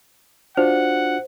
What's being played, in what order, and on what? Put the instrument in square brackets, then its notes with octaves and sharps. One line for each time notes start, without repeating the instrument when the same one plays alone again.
[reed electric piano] D4 F4 F#4 [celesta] C5 [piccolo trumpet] F#5